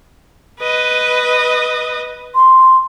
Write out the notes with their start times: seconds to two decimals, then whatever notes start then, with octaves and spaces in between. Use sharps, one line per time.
0.60 B4 D#5
2.35 C6